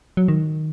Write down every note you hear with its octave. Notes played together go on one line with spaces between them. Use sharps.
F#3
D#3